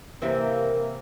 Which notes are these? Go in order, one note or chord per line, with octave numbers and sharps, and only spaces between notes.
C3 E3 A#3 C4